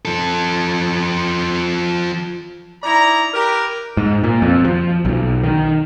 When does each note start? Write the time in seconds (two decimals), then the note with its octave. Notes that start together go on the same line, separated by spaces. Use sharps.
0.05 F3 A4
2.83 D#4 E4 D5 A#5
3.34 G4 A#4 B4
3.97 G#2
4.24 A#2
4.42 F2
4.64 F3
5.05 B1
5.44 D#3